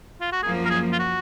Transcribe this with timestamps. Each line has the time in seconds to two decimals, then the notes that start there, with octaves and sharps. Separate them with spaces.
0.21 F4
0.32 F#4
0.43 F#2 F3 A#3 G#4
0.65 A#4
0.70 G#4
0.92 F4
0.99 F#4